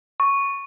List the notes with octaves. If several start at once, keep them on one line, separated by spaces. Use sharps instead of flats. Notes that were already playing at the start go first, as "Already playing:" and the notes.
C#6